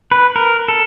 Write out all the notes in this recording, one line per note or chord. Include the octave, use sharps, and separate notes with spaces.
B4
A#4
A4